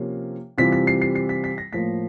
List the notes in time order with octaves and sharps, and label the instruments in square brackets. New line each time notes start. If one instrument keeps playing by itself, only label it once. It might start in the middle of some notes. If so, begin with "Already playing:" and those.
Already playing: [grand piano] C3 F3 A#3 C#4 F4
C3 E3 G3 C4 F4 B6
B6
C7
C7
C7
B6
B6
A#6
A2 F3 A#3 B6